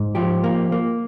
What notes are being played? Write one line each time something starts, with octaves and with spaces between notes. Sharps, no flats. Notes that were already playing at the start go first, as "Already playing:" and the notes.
Already playing: G#2
F3 G4
A#3
A#3